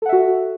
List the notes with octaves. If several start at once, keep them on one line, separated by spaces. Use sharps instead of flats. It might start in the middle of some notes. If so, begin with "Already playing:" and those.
F#4 A4 E5 F#5